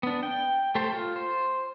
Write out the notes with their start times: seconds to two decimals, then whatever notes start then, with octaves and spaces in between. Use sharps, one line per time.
0.03 B3 D4
0.23 G5
0.75 A3 G4 A4 C5
0.93 F4
1.16 C5